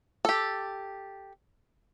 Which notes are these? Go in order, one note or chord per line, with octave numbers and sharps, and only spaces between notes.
G4 A4